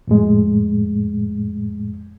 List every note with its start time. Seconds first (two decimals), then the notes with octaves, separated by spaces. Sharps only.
0.07 F2 A2 G#3